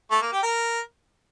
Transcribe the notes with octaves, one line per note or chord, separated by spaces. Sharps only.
A3
A#3
G4
A#4